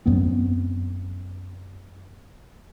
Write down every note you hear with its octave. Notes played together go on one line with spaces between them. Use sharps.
F#2 B3 C4